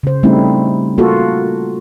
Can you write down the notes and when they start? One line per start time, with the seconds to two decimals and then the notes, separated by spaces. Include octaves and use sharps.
0.03 C#3 C5
0.23 G3 A3 C4 C#4 D#4 E4
0.98 A#3 F4 F#4 A4